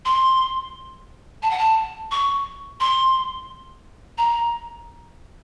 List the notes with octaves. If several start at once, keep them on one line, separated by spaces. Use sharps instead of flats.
C6
A5
F#5
A5
C#6
C6
A#5